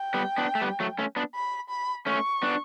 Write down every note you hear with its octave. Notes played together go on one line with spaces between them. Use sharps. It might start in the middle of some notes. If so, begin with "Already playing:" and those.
Already playing: G5
G3 B3
B3 D4
A3
G3 B3
F#3 A3
A3 C#4
B3 D4
B5
B5
A3 C#4 C#6
B3 D4